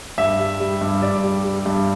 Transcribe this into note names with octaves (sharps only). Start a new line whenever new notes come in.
G2 E5
G3
G3
G2
G2 D5
G3
G3
G2